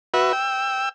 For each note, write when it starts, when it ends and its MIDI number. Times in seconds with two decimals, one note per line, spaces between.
0.14 0.32 66
0.14 0.32 71
0.14 0.32 76
0.33 0.89 79
0.33 0.89 88